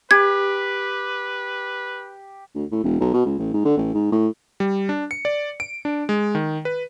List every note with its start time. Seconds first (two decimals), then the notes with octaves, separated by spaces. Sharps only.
0.11 G4 B4 G#6
2.55 D2
2.71 A2
2.84 E1
3.00 B1
3.14 B2
3.25 C#2
3.38 A1
3.53 G#2
3.65 D3
3.77 A1
3.94 G#2
4.12 A2
4.60 G3
4.89 D4
5.11 C#7
5.25 D5
5.60 D7
5.85 D4
6.09 G#3
6.35 D#3
6.65 B4